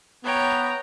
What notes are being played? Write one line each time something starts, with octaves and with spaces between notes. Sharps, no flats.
B3 C#5 G5 A#5